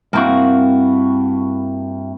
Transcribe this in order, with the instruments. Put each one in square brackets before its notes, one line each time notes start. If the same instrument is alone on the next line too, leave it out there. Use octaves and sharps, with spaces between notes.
[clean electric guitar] G2 E4 F#4 [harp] A#3 C4